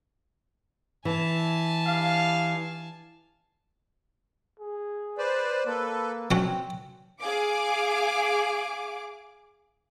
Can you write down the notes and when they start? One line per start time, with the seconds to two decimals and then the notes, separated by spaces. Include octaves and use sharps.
1.05 E3 G#5 A5
1.84 G2 F5
4.60 G#4
5.18 B4 C5 D5
5.66 A#3 A4 B4
6.31 F#3 C4 C#4 F#5 G5
7.21 G#4 F5 D6